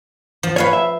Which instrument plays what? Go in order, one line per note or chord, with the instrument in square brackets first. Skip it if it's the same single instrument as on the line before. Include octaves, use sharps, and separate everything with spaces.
[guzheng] F3
[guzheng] B4 F5 G#5 [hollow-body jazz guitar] C#5
[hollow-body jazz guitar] E5